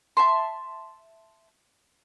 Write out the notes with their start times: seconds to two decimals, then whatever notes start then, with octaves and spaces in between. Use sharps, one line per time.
0.17 E5 A5 C6